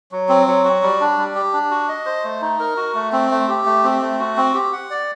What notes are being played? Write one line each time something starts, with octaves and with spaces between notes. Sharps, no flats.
F#3
C4
F#3
F#4
G3
D4
G3
G4
D4
F#4
D#5
C5
A3
D#4
A#4
F#4
A3
C4
A3
G4
A3
C4
A3
F#4
C4
G4
F#5
D5